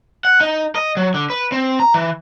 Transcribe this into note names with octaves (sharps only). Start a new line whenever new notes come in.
F#5
D#4
D#5
F#3
D3
B4
C4
A#5
E3